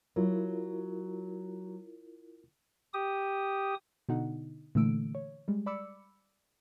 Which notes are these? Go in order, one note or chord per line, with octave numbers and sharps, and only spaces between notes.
F#3 E4 F4 A#4
G4 D#6
B2 D3 D#4 F#5
A#2 D3 E3 A3 E6 D7
C#5
G3 G#3
D5 B5 D6 E6 C#7